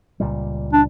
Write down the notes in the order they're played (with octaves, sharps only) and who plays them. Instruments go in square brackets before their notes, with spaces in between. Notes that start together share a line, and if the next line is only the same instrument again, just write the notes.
[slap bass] C#2 A#2 G3
[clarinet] D4